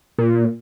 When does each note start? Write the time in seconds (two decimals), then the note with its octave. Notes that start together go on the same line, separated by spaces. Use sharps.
0.18 A#2